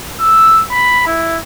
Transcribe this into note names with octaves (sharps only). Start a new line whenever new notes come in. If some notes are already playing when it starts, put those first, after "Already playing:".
E6
B5
E4